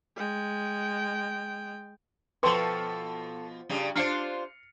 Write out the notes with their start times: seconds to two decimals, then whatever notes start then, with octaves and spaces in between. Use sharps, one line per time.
0.17 G#3 G5
2.43 B2 F3 A4 B4 G5 C6 C#6
3.69 G2 C#3 G3
3.95 D4 F4 C5 F6 C7 C#7